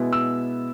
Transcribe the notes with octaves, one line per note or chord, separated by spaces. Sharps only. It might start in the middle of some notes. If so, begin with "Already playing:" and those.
Already playing: B2 G#3 B3 E4
E6